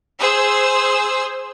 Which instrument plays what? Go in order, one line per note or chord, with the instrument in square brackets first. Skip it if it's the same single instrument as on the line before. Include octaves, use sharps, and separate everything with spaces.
[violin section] G#4 C5 E6